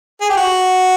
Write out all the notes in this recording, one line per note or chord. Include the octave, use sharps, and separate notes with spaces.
G#4
G4
F#4